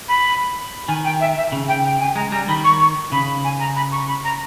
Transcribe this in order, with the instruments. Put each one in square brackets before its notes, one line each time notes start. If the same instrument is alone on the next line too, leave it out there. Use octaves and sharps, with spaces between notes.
[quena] B5
[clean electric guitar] D#3 [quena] G#5
[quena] G5
E5
E5
[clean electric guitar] C#3
[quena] G5
G5
G#5
[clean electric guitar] G#3 [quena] A#5
[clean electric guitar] G3 [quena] A#5
[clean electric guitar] D#3 [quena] B5
[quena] C#6
C#6
[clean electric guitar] C#3 [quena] B5
[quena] G#5
A#5
B5
C#6
B5
A#5